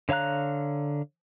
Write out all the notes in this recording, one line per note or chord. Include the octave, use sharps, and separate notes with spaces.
D3 C#5 F5 A#5 F#6